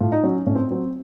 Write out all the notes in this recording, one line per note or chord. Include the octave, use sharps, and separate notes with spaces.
A2 F4
D#4
F#3 C#4
A2 C#4
C4
F#3 C4